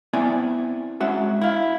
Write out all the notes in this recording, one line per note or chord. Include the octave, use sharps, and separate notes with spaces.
B3 C4 E4 D5 E5 G#5
G#3 C#4 F#4 E5
E4 F5